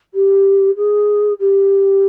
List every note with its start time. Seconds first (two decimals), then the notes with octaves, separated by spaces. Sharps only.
0.14 G4
0.76 G#4
1.39 G4